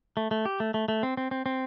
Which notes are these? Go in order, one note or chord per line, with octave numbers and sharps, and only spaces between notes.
A3
A3
G4
A3
A3
A3
C4
C4
C4
C4